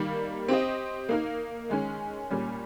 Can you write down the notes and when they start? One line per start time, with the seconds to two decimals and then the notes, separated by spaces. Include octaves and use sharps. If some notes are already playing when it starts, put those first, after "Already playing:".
Already playing: D#3 G3 A#3
0.48 C4 G4 C5 D#5
1.09 A#3 D#4 A#4
1.70 D#3 G#3 C#4
2.31 A#2 G3 C#4